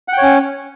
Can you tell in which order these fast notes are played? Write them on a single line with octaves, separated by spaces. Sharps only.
F#5 G5 C#5 C#4